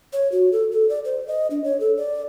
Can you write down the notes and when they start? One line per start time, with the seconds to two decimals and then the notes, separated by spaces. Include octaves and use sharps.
0.13 C#5
0.32 F#4
0.52 A4
0.72 A4
0.89 D5
1.05 C5
1.27 D#5
1.51 D4
1.64 C#5
1.80 A4
1.97 D5